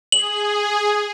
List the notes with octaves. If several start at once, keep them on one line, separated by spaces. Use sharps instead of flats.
G#4 F#7